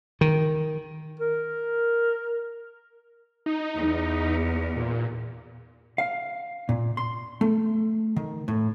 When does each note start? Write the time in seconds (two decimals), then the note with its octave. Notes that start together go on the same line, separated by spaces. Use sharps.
0.21 D#3
1.20 A#4
3.46 D#4
3.75 E2
4.76 A#2
5.98 F5
6.69 A#2
6.97 C6
7.41 A3
8.16 D#3
8.48 A2